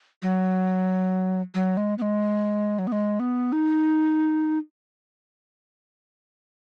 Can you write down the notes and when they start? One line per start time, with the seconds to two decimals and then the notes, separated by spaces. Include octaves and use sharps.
0.22 F#3
1.55 F#3
1.77 G#3
1.98 B3
2.02 G#3
2.79 F#3
2.87 B3
2.92 G#3
3.20 B3
3.52 D#4